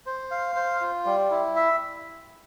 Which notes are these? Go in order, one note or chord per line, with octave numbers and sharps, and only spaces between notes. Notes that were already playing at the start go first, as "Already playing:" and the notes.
C5
F5
C5
F4
G3
E4
E5